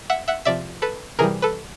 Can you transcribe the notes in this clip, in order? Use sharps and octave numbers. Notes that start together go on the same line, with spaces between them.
E5 F#5
E5 F#5
C3 F3 D5 E5
A4 B4
C3 E3 G3 G#4 A#4
A4 B4